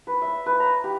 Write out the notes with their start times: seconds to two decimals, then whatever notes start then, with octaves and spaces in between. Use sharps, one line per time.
0.07 B4
0.22 E5
0.46 B4
0.60 A#5
0.84 G4